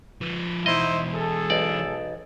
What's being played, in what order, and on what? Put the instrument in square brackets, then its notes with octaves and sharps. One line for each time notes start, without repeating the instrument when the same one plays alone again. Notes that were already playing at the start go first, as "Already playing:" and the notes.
[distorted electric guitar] F3 B4
[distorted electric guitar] E2 B2 [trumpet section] D#4 E4 C5 [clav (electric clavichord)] D#5
[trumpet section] G#4 A4
[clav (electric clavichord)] B1 D5